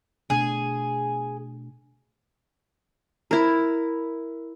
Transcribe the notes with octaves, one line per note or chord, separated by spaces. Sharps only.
B2 A3 D4 G#4
E4 A#4